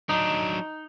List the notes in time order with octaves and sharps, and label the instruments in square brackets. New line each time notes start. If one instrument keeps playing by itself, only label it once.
[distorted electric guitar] F#3 D4 [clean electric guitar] D#4